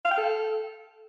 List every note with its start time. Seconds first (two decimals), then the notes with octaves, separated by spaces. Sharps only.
0.04 F5
0.11 G5
0.17 A4